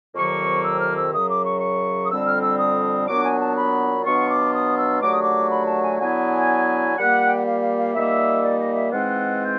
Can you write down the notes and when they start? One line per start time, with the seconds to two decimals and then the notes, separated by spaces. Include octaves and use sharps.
0.15 F2 C3 D#3 F#3 A#3 C#6
0.64 E6
0.80 F6
0.97 E6
1.12 F#2 C#3 F#3 D#6
1.30 D6
1.45 C#6
1.61 C#6
2.05 D#6
2.10 F2 D3 G3 C4 E6
2.26 F6
2.42 E6
2.58 D#6
3.08 A#2 F#3 B3 D4 D6
3.24 G#5
3.40 A5
3.56 B5
4.05 B2 F#3 B3 D4 F4 C#6
4.29 D6
4.54 D#6
4.78 E6
5.02 D#2 D3 F#3 A3 D6
5.13 D#6
5.23 D6
5.51 B5
5.67 A5
5.83 G#5
5.99 D3 F#3 B3 E4 G#5
6.98 A#2 G3 A#3 F#5
7.27 G5
7.37 F#5
7.46 F5
7.62 F5
7.78 F5
7.94 A#2 G3 A#3 D#4 E5
8.43 D5
8.59 D#5
8.76 E5
8.92 G#2 E3 G#3 C4 F4 F#5
9.41 G5